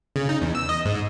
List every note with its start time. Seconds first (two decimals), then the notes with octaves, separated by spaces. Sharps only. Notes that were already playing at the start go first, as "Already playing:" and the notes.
0.16 C#3
0.29 D#4
0.41 E2
0.55 E6
0.69 D#5
0.85 G#2